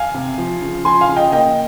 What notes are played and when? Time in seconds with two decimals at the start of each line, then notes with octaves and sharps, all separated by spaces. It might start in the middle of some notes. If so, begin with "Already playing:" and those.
Already playing: F5 G#5
0.14 C3
0.38 F3
0.62 C#3
0.84 F3 G#5 C6
1.01 F5 G#5
1.08 C#3
1.16 D#5 G5
1.32 A#3 D#5 G5